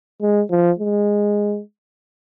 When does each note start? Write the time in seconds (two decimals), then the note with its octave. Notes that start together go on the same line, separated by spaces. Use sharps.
0.22 G#3
0.51 F3
0.79 G#3